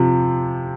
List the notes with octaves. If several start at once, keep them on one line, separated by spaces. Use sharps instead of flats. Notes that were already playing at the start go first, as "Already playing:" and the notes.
Already playing: C3 F3